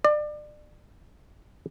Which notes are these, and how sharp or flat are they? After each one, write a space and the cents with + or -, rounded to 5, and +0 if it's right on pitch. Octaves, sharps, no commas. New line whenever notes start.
D5 +30